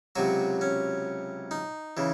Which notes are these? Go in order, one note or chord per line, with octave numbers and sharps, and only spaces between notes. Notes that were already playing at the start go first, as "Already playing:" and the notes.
C#2 C3 F#3 F#4
C#4
D#4
C#3 E3